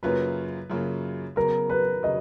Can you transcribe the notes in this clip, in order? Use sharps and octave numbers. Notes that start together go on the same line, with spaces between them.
F#2 C#3 F#3 A#3 F4 B4
F#2 C#3 F#3 A#3 F4
C#3 F#3 B3 A#4
B4
C#3 F#3 D#5